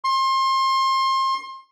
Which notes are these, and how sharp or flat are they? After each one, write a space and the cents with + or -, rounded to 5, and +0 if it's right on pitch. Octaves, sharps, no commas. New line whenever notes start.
C6 +30